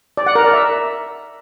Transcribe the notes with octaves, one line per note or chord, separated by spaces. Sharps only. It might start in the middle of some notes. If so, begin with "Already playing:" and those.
D5
F#5
A#4
D5
E5